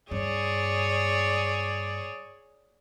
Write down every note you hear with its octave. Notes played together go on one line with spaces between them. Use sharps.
G2 G#4 C#5 D5